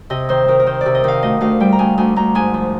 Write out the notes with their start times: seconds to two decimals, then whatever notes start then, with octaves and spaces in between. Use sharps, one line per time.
0.10 C3 D#5
0.29 D#3 C5
0.48 D#3 A#4
0.60 A#4
0.66 D#3 C5
0.81 C3 D5
0.95 D#5
1.04 D#3 F5
1.22 D2 D#5
1.41 D2 F5
1.60 G3 G5
1.72 A#5
1.79 D2 G#5
1.97 D2 G#5
2.16 D2 A#5
2.35 G#2 G#5
2.54 F3